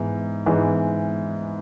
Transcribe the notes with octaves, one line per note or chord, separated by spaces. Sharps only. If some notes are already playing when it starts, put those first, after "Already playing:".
Already playing: G#2 E3 G#3 B3
G#2 E3 G#3 B3